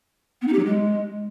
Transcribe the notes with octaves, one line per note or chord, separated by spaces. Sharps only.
B3
D#4
G4
F#3
G#3